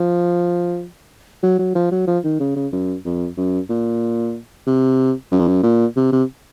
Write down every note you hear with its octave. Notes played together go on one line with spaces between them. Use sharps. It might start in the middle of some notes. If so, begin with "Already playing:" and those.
Already playing: F3
F#3
F#3
F3
F#3
F3
D#3
C#3
C#3
F#2
F2
F#2
A#2
C3
F#2
F2
F#2
A#2
C3
C3